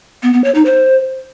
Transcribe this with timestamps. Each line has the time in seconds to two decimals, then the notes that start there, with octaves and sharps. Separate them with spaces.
0.23 B3
0.34 B3
0.44 C#5
0.55 D#4
0.65 C5